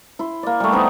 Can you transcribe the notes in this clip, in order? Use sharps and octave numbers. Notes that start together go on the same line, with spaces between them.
E4 C6
A#3 D5
G3 A3
B3 C4 D#4